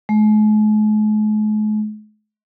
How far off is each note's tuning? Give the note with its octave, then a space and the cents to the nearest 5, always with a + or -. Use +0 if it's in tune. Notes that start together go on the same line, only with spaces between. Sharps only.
G#3 +45